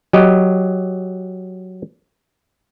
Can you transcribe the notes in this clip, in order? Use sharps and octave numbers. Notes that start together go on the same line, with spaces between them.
F#3 G4 D#5